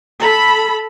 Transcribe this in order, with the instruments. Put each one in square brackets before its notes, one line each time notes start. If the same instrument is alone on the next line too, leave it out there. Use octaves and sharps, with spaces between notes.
[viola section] A4 B5